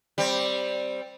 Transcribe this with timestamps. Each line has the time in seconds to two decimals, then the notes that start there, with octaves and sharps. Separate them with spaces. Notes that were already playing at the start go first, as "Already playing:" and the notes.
0.18 G3 C4